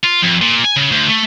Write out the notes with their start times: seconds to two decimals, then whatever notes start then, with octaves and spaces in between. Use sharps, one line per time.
0.03 F4
0.22 F2
0.42 A#2
0.65 G#5
0.76 C#3
0.92 D2
1.09 A3